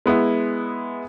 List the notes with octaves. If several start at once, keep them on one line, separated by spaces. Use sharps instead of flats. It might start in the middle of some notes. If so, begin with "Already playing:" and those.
G#3 B3 E4